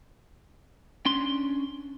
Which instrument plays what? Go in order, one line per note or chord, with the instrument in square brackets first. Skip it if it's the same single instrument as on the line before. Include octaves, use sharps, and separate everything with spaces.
[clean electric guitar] C#4 D4 C6